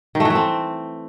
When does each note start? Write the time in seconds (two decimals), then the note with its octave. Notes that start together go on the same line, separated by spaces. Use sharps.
0.15 D#3
0.20 A3
0.25 E3
0.30 A3
0.35 C4